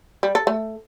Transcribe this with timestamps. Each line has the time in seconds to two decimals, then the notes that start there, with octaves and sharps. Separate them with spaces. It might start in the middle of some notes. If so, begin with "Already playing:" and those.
0.23 G3
0.35 A4
0.47 A3